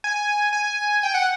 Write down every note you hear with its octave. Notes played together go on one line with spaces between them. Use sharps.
G#5
G#5
G5
F#5